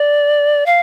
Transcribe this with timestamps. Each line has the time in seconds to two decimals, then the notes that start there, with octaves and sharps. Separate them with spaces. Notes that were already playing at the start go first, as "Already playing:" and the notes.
Already playing: D5
0.66 F5